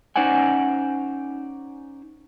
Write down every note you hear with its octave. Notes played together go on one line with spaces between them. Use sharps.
C#4 D#4 C5 D5 F#5 G#5